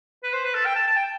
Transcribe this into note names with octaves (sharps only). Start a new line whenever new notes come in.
B4
C5
B4
A4
G5
A5
A5
G5